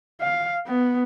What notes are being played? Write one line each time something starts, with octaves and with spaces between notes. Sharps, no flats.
F5
B3